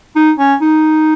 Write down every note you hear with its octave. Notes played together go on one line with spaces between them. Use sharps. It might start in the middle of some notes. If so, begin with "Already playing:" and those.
D#4
C#4
D#4